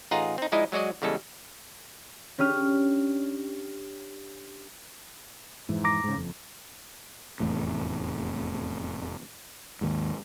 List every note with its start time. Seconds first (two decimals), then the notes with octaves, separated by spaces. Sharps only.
0.11 A1 D#4 F4 G#4 F#5 A#5
0.38 C4 D#4
0.52 F3 G#3 D#4 E4 D5 D#5
0.72 F#3 G#3 F#4 D5 D#5
1.02 E2 C#3 G3 G#3 A4
2.38 C#4 D4 G4 F6 D#7
5.69 F2 G#2 E3
5.84 A#5 D6 A#6
6.04 G#2 C#3
6.16 F#1 F2
7.40 F1 E2 A2
9.81 D#2 G#2